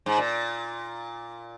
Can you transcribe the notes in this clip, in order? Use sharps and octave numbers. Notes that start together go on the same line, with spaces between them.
G#2
A#2